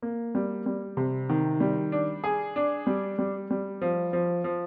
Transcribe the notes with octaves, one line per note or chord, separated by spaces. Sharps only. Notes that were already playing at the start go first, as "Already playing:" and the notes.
A#3
G3
G3
C3
D#3
G3
D4
G#4
D4
G3
G3
G3
F3
F3
F3